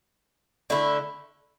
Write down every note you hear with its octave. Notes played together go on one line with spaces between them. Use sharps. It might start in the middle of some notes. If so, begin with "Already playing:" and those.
D3 A3 E4